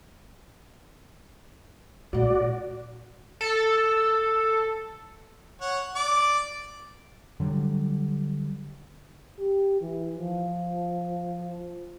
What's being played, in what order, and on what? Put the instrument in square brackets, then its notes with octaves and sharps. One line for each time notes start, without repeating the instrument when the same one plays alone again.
[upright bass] A#2 G#3 [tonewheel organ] F#4 D5
[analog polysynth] A4
[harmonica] C#5 F#5
D5 D6
[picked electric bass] D3 F#3 G3
[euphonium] G4
E3
F3